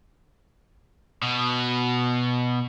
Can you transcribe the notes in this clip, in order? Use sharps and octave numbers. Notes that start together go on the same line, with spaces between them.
B2